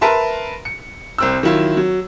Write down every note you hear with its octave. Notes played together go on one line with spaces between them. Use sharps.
A#4 B4 E5 A5 C6
C#7
C2 C4 E6
D#3 F#3 E4 F4
F#3